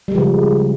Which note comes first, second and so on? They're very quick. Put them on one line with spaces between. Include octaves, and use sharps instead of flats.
G3 G#3 F3 C#3